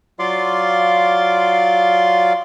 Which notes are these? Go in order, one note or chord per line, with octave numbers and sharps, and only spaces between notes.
F#3 F4 D5 F5 C6 D6